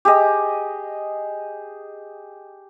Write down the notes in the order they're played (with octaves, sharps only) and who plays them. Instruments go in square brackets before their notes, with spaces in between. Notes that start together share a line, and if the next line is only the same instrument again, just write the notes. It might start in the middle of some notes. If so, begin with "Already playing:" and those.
[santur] G4 G#4 D#5